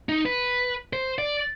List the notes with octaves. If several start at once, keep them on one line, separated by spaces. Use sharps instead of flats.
D#4
B4
C5
D5